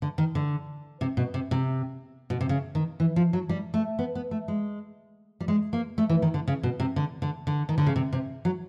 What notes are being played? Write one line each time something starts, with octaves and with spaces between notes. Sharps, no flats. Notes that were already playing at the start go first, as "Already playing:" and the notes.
D3
D#3
D3
C3
B2
C3
C3
B2
C3
C#3
D#3
E3
F3
F#3
G3
A3
B3
B3
A3
G#3
G3
G#3
A#3
A3
E3
D#3
D3
C#3
B2
C3
D3
D3
D3
D#3
D3
C#3
C3
C3
F#3